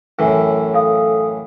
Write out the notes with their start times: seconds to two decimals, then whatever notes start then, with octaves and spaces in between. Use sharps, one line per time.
0.19 F#2 A2 E3
0.74 A4 F5 D#6